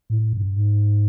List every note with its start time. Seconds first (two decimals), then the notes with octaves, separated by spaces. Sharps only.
0.10 A2
0.33 G2
0.56 G#2